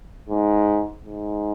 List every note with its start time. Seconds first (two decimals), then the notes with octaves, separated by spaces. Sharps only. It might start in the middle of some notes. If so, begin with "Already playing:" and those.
0.30 G#2
1.05 G#2